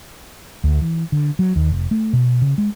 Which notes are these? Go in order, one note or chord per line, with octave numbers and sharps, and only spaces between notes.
D2
E3
D3
F#3
D#2
F1
A3
B2
C#3
G#3